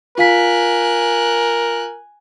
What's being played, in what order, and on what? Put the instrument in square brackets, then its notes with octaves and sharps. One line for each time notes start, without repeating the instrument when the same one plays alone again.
[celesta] F4 F5 B6 [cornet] A#4 [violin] G#5 F#6